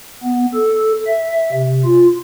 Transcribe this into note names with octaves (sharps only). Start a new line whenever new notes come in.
B3
A4
E5
C3
F4